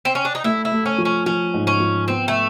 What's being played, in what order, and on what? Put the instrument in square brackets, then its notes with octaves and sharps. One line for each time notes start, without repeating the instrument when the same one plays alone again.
[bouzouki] C4
C#4
D4
D#4
[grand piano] A3 [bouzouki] E4
[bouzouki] E4
[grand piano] A3
[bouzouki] C#4
[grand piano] F3
[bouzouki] C#4
[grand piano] F3 [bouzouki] C#4
[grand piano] G#2
[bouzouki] C#4
[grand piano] F3
[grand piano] B3 [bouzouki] C4
[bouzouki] A3